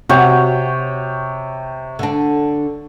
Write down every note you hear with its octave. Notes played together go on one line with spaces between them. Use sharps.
C3 F#4 C#5 G5
D3 D4